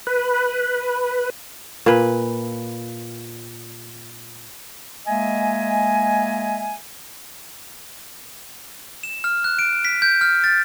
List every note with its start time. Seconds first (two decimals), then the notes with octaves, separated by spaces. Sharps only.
0.07 B4
1.86 A#2 B4
5.06 G#3 A#3 D#5 E5 G#5
9.03 E7
9.24 F6
9.44 F#6
9.59 D7
9.85 B6
10.02 G6
10.21 F6
10.44 A6